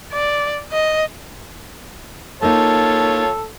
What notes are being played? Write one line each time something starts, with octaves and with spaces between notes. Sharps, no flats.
D5
D#5
A#3 D#4 F4 A4 C#5 A5